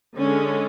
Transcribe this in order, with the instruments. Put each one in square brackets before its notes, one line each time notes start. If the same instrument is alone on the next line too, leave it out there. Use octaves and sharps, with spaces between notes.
[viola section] D3 G#3 C#4